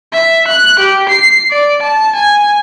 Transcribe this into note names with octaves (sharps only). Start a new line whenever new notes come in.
E5
F#6
G4
C7
D5
A5
G#5